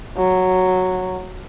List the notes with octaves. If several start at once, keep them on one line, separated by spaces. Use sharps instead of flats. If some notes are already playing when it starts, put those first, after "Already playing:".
F#3